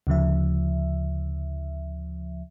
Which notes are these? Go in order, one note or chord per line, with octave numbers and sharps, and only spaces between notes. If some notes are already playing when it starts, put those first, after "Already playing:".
D2 C#3 F3 E5